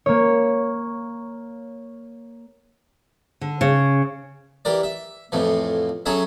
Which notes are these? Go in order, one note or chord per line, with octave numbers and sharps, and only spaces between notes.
A#3 C#5
D3
C#3
E3 G4 A#4 D5
E5
F2 A2 E3 F3
F#3 C#4 G#4 A4 C#5 E5